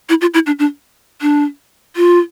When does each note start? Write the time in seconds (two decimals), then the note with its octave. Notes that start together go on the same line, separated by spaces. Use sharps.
0.09 E4
0.21 F4
0.34 E4
0.46 D4
0.59 D4
1.21 D4
1.96 F4